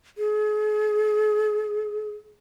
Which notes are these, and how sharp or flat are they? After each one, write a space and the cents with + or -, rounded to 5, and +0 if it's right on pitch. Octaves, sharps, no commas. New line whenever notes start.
G#4 +40